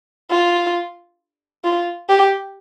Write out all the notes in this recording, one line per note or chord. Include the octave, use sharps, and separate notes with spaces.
F4
F4
G4